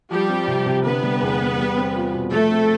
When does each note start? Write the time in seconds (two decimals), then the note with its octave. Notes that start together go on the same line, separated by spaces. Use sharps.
0.11 F3 G3 G4
0.29 C4
0.47 C3
0.66 C3
0.85 D3 B3 B4
1.03 G3
1.21 E2
1.40 E2
1.58 G3
1.77 C4
1.96 F4
2.13 B2
2.31 F3 A3 A4
2.51 C4